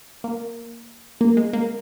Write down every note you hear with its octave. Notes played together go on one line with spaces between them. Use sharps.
A#3
A#3
G#3
A#3